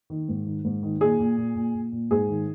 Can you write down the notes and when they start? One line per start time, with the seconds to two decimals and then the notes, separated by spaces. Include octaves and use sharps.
0.10 D#3
0.29 G#2
0.46 D#3
0.65 G#2
0.83 D#3
1.01 A#2 G#4
1.20 A#2
1.38 A#2
1.55 A#2
1.75 A#2
1.92 A#2
2.11 G#2 G#4
2.29 D#3